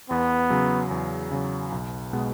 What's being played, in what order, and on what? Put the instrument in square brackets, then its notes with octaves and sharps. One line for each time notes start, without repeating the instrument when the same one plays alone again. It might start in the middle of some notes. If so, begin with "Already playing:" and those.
[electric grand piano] E2 [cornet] B3
[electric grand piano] C#3 F#3
E2
C#3 F#3
B1
B2 G#3 B3